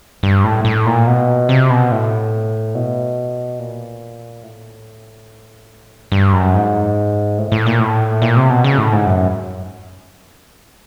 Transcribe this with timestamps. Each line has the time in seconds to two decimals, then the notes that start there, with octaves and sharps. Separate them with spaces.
0.23 G2
0.44 A2
0.65 A2
0.86 A#2
1.07 B2
1.49 C3
1.70 B2
1.91 A2
2.75 B2
3.59 A#2
4.43 A2
6.12 G2
6.33 F#2
6.54 G#2
7.38 A2
7.52 A2
7.66 A#2
7.80 A2
8.22 A#2
8.36 C3
8.50 B2
8.64 C#3
8.78 A2
8.92 G#2
9.06 F#2